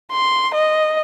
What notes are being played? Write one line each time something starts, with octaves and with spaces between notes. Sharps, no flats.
C6
D#5